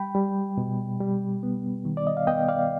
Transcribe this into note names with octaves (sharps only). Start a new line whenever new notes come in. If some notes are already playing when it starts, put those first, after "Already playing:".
Already playing: G3 G5 B5
G3
B2
G3
B3
D#3
D5
D#5
F5
B3 D#5 G5
D5 F5